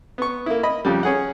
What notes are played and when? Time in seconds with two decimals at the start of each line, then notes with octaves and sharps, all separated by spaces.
0.18 B3 C#6
0.46 A#3 E4
0.63 D#5 B5
0.85 F2 C#3 G3
1.03 C#4 G#4 F#5